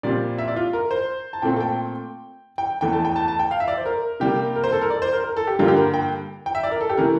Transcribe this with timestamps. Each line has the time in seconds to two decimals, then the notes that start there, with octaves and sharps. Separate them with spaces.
0.03 A#2 G3 C4 D5
0.38 E5
0.48 D5
0.56 F4
0.73 A#4
0.91 C5
1.33 A5
1.42 A#2 A3 C4 G5
1.56 A5
1.60 G5
2.58 G5
2.81 E2 E3 A3 G5
2.92 A5
3.05 G5
3.16 A5
3.28 A5
3.39 G5
3.51 F5
3.60 E5
3.68 D5
3.78 C5
3.86 A#4
4.20 C3 G3 A#3 G4
4.56 A#4
4.64 C5
4.72 A4
4.82 A#4
4.90 D5
5.02 C5
5.13 A#4
5.24 A#4
5.37 A4
5.47 G4
5.59 G2 D3 G3 A#3 F4
5.68 G4
5.76 A#4
5.94 G5
6.46 G5
6.55 E5
6.63 D5
6.71 A#4
6.81 A4
6.89 G4
6.97 C3 E3 A3 A#4